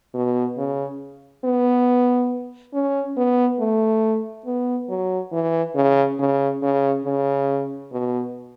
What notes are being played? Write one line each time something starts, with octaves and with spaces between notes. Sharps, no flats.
B2
C#3
B3
C#4
B3
A3
B3
F#3
E3
C#3
C#3
C#3
C#3
B2